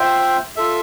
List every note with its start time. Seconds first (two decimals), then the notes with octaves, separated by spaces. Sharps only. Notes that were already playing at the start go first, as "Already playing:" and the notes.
Already playing: F4 C5 E5 G5
0.56 F4 A4 E5